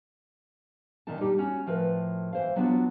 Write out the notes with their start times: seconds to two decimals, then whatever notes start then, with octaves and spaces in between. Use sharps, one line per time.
1.07 A#2 D#3 E3 D#4 A5
1.21 G3 D#4 G4
1.38 C#4 F#4
1.66 A2 F3 A#4 B4
2.33 E3 C5 F5
2.56 F#3 B3 D4 F4 F#4